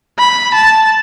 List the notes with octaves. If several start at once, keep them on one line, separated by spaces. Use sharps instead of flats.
B5
A5